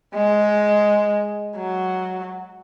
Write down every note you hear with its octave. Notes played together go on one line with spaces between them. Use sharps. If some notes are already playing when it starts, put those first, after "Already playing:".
G#3
F#3